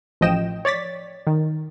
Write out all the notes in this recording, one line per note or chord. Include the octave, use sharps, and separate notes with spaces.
A1 F3 D#5 G5 E7
C#5 D5 A6 B6
D#3